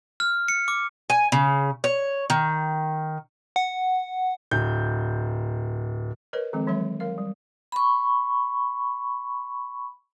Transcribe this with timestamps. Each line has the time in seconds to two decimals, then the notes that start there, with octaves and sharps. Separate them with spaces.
0.20 F6
0.48 C#7
0.68 D6
1.10 G#5
1.32 C#3
1.84 C#5
2.30 D#3
3.56 F#5
4.51 D1 G6
6.33 A#4 B4 C#5 D#5
6.53 D#3 F3 G#3 C4
6.67 E3 F#3 G#3 C#5 E5
7.00 F#3 A#4 F5
7.18 G3
7.72 B5 C#6